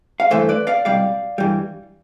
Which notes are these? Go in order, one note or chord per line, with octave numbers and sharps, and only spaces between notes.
F5
G2 E3 A3 C5 E5
B4 D5
D5 F5
C2 B2 G3 D5 F5
G2 E3 G3